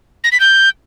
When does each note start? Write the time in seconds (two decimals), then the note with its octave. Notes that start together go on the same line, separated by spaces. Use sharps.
0.24 A#6
0.32 B6
0.40 G6